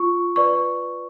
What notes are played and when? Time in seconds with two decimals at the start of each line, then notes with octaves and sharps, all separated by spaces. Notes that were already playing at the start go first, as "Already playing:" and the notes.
Already playing: F4 C#6
0.36 B4 D5 C#6